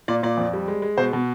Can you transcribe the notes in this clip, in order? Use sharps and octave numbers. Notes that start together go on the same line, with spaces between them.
A#2 D5
A#2 D5
F2
G3
G#3
G#3
B2 C5
B2